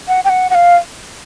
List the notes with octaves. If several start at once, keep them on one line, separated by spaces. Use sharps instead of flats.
F#5
G5
F#5
F#5
F5